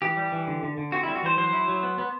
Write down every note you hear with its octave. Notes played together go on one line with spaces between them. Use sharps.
E3 G4
G3
E3
D3
D3
D3
C4 F#4
E4
G3
F#4
E3 C5
F#3 C5
E4
F#3
B3
B3